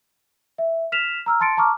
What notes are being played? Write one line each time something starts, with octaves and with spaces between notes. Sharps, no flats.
E5
F6 B6 E7 F7
A#5 E6 F6
A5 C6 A6 C#7 D7
A5 A#5 C#6 D6 F6